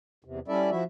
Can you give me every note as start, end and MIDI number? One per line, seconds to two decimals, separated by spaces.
0.25 0.39 40
0.25 0.39 48
0.48 0.70 55
0.48 0.70 61
0.48 0.70 64
0.48 0.70 69
0.48 0.70 74
0.48 0.70 76
0.71 0.84 53
0.71 0.84 64
0.71 0.84 66
0.71 0.84 76